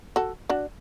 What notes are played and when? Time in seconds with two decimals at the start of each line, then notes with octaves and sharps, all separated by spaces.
0.16 F#4 A4
0.49 D4 F#4